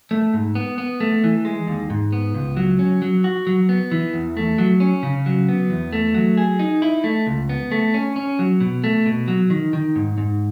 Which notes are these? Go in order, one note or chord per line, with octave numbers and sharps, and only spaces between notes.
A3
G#2
B3
B3
A3
E3
G#3
D#2
G#2
B3
C#2
F#3
C#4
F#3
F#4
F#3
B3
E3
E2
A3
F#3
C#4
C#3
F#3
B3
E2
A3
F#3
G#4
D#4
E4
A3
C#2
B3
A3
C#4
C#4
F#3
B2
A3
B2
F#3
D#3
D#3
G#2
G#2